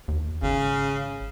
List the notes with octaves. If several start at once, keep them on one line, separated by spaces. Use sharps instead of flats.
D#2
G#1 C#3